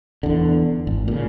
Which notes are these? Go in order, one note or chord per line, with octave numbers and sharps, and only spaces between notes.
E2 D3
G#1
A#2 C#3